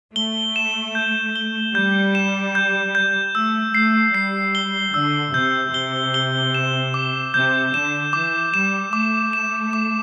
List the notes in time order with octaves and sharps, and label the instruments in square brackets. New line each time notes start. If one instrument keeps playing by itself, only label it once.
[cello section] A3 [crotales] G7
[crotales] E7
G6
G7
[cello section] G3 [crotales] G6
[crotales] E7
G6
G6
[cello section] A3 [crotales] E6
[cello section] A3 [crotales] C7
[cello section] G3 [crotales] C7
[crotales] G7
[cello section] D3 [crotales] E6
[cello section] C3 [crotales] G6
[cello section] C3 [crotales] G7
[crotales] G7
E7
D6
[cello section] C3 [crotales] G6
[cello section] D3 [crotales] E7
[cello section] E3 [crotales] D6
[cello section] G3 [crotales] E7
[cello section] A3 [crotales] D6
[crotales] E7
D6